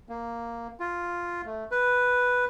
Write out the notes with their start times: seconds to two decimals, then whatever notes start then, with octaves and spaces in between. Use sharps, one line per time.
0.09 A#3
0.80 F4
1.45 A3
1.71 B4